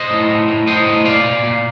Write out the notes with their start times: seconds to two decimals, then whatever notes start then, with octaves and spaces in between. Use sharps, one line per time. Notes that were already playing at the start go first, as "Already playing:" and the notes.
Already playing: C5 D#5
0.10 A2
0.29 A2
0.48 A2
0.67 A2 C5 D#5
0.86 A2
1.05 A#2 D5 F5
1.24 A#2
1.43 A#2